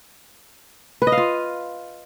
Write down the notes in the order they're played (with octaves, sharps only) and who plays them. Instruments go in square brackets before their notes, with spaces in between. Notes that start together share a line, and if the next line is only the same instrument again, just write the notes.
[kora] B4
D#5
F5
F4